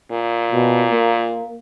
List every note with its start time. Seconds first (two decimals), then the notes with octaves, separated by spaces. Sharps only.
0.11 A#2
0.52 B2
0.92 A#3